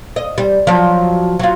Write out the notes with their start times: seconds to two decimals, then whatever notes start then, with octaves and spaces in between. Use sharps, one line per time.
0.16 D#5
0.38 G3
0.67 F3 F#3
1.39 F#3 F4